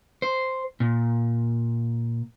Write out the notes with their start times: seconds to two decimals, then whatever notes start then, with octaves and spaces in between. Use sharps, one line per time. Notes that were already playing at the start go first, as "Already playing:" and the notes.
0.22 C5
0.80 A#2